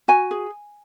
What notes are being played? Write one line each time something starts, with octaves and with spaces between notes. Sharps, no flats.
F#4 G#5
G#4